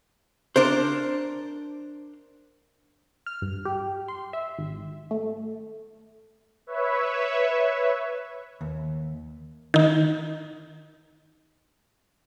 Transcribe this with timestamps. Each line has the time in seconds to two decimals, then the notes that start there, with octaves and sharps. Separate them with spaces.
0.56 D4 A#4 C5
3.26 F6
3.42 G2
3.65 G4
4.08 C6
4.33 E5
4.59 G#1
5.11 A3
6.67 B4 C#5 E5
8.61 D#2
9.74 D#3 D#4